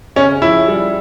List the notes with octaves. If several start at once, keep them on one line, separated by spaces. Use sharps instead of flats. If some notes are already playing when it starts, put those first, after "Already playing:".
C#3 C#4
F3 E4
G3